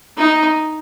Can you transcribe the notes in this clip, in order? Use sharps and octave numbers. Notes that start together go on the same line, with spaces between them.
D#4